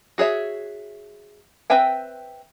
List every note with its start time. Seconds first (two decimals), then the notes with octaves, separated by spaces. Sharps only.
0.18 F#4 G#4 C#5 E5
1.70 C4 B4 E5 G5 G#5